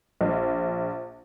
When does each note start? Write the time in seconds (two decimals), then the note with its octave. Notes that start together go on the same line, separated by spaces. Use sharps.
0.21 A#1